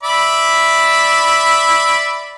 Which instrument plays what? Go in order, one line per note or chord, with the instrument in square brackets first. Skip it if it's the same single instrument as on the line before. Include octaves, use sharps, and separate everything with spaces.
[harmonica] D5 E5 B5